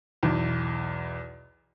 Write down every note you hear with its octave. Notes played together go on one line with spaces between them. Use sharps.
B1 E2